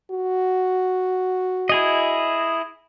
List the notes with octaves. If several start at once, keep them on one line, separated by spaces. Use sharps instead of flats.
F#4
E4 G#4 D#5